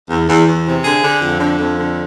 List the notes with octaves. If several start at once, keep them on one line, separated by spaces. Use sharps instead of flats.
E2
E2
E2
C3
D3 G#4
D3
F2
D3
F2
D3